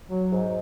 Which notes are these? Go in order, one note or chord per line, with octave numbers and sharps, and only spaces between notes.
F#3
G#2